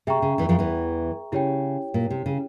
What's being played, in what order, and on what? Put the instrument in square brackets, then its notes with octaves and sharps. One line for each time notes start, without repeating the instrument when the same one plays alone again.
[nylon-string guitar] C3 [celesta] G#4 E5 G5 A#5 C#6
[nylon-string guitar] C#3
E2 E3
F2 F3
E2 E3
[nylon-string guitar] C#3 [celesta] E4 G4 C#5 G5
[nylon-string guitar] A#2
C3
C#3